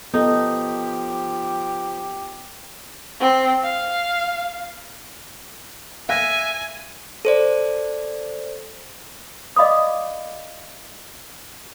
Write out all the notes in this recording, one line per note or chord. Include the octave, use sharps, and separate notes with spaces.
F3 B3 D#4 G4 A4
C4
F5
E5 F5 G#5 F#6 A#6
A4 C5 D5
D5 D#5 F5 B5 D6 D#6